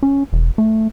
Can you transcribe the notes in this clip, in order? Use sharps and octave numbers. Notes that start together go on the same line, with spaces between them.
C#4
E1
A3